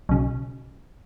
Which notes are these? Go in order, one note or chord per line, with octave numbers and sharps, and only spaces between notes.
B1 C#3